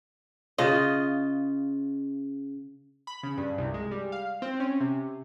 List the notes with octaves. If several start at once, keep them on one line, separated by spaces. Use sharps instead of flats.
C#3 F4 D#5
B5
C#3
G2
C2
G#3
G3
F5
C4
C#4
C3